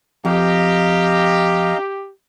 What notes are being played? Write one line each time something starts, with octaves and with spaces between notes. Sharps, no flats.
F2 G4 D#5 F5 A#5